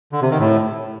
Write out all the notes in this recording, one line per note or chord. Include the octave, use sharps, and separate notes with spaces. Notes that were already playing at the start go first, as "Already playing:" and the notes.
D3
C3
D#3
A2